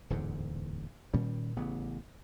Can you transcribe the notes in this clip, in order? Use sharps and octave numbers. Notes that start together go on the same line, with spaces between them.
D1 E2 G#2 D3
A#2 D#3 G3 C#4
A1 C#3 B3